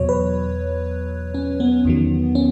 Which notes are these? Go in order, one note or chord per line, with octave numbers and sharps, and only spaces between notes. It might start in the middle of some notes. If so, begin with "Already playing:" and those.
Already playing: E2 B2 F#3 C#5
B4
C#4
B3
E2 D#3 F#3
C#4